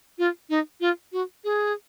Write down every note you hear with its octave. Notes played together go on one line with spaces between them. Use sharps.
F4
D#4
F4
F#4
G#4